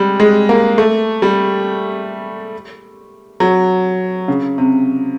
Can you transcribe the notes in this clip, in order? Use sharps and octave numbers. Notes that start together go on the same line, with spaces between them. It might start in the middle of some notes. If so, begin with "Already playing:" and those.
Already playing: G3 G#3
G#3
A#3
A3
G3
F#3
C#3
C3